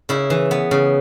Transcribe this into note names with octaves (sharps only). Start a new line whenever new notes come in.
C#3 E4
E3
B3
C#3